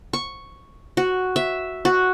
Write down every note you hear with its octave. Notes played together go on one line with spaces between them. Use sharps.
C#6
F#4
E5
F#4